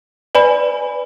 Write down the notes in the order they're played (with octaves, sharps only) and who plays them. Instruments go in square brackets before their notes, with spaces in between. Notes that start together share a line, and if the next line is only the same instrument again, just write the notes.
[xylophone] B4 D5 G#5 B5